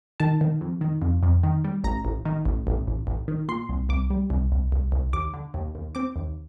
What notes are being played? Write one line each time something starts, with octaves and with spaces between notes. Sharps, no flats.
D#3 A5
D#3
F2
D#3
F2
F2
D#3
G3
A1 A#5
A1
D#3
A1
A1
A1
A1
D#3
A#2 C6
C2
C2 D6
G3
C2
C2
C2
C2
D#2 D6
D3
D#2
D#2
C4 D6
D#2